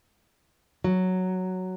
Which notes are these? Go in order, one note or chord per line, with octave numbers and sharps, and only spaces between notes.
F#3